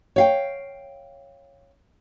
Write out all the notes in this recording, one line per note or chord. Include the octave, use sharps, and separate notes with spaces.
C#5 F5 G5